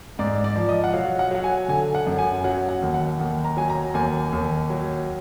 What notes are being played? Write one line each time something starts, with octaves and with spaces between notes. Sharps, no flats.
G#2 D5
D5
F3
D#5
F#5
F#3 F5
F#5
F#3 F#5
G#5
D3 G#5
F#5
F#2
G#5
F#3 F#5
F#5
D#2
F#5
D#2
A#5
F#3 G#5
A#5
D#2 G#5
D#2
F#3